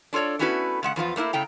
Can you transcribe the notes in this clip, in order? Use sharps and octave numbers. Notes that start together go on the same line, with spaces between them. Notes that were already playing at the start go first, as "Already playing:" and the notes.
D4 F4 A4 C#5 D5
A3 B3 C#4 E4 F#4 B4
C#3 G#3 F#5
E2 F3 B3 F4
A3 A#3 C#4 E4
C#3 A3 G5 A#5